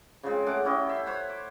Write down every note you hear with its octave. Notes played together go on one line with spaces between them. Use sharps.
C#3 F3 G#3 C4
A3 C#4 F#5 D6
C#4 E4 G4 D#5
E5 C6
C5 C#5 F#5 B5
D6